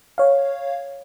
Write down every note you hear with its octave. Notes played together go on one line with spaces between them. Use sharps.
C#5 F5